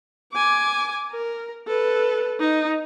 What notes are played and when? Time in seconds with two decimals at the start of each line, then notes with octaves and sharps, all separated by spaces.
0.33 G#5 D6
1.12 A#4
1.67 A4 B4
2.40 D#4